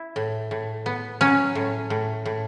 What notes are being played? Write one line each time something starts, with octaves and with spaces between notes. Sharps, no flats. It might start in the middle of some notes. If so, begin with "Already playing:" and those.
Already playing: E4
A2
A2
B3
F#3 C#4
A2
A2
A2